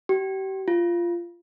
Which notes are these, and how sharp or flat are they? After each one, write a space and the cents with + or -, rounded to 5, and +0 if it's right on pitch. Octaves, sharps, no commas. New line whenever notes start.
G4 -35
F4 -15